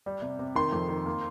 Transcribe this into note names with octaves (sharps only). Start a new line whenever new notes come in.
G3
C3
C3
D#3 C6
F2
D#3
A#3